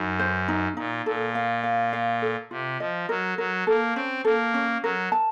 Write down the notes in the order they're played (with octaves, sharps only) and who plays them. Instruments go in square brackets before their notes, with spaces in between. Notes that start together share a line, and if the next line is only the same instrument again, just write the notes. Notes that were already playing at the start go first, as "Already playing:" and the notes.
Already playing: [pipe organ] F#2 [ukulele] D#4
[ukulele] C5
D#4
[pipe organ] A#2 [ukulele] D#4
[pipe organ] A#2 [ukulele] A4
[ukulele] F5
F5
F5
A4
[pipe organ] C3 [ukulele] F4
[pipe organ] F3 [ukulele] D#5
[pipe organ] F#3 [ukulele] A#4
[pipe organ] F#3 [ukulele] A#4
[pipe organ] A#3 [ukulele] A4
[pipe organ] C4 [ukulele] C#4
[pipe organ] A#3 [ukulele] A4
[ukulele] C#4
[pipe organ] F#3 [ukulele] A#4
[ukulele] A5